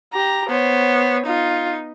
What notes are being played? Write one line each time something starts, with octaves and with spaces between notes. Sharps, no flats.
G4 A#5
B3 C5 C#5
D#4 F4